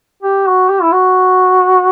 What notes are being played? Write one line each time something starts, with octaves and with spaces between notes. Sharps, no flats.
G4
F#4
G4
E4
F#4